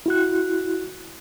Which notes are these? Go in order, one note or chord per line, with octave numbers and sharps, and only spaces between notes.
E4 F#4 F#6